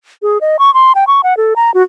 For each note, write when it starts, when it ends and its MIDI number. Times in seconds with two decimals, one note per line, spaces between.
0.22 0.38 68
0.41 0.57 75
0.59 0.73 85
0.74 0.92 84
0.95 1.04 79
1.07 1.21 85
1.24 1.36 78
1.37 1.54 69
1.56 1.73 82
1.74 1.83 66